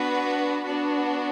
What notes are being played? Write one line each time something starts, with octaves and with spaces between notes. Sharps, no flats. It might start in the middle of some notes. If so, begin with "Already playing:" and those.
Already playing: B3 D4 F#4 B4
B3 D4 F#4